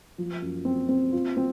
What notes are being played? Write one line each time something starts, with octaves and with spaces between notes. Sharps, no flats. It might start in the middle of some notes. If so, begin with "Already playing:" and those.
F3
F#2
C4
C4
F4
C4